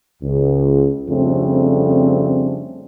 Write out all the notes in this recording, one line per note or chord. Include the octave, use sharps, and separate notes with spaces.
C#2
F2 C#3 G3 A3 C4 D4